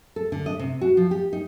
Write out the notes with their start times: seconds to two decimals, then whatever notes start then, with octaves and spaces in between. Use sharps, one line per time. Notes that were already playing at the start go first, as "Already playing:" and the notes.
0.16 A4
0.32 D3
0.46 D#5
0.59 C3
0.81 F#4
0.97 F3
1.11 G4
1.33 D#4